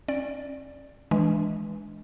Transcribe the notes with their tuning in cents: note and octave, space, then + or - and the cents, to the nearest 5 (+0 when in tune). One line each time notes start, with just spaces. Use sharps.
C#4 -45 D5 +0
E3 +0 G#3 +5 D4 +0